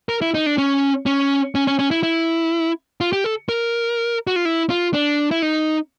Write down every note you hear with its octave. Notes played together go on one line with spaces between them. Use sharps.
A#4
E4
D#4
D4
C#4
C#4
C#4
C#4
C#4
E4
E4
F4
G4
A4
A#4
F#4
F4
E4
F4
D4
E4
D#4